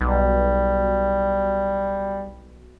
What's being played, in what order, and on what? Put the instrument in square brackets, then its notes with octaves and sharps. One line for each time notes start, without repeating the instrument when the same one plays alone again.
[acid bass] B1 [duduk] G3